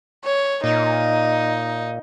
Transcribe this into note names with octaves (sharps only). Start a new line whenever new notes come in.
C#5
A#2 D#4